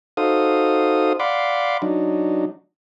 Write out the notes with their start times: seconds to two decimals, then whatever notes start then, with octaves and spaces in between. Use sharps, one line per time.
0.17 D#4 F#4 A4 C5 F5 D#6
1.20 D5 F5 F#5 B5 C6 D6
1.82 F#3 D4 D#4